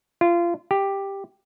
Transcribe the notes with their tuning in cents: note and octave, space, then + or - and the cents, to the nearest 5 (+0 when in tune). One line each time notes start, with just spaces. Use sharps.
F4 -25
G4 +5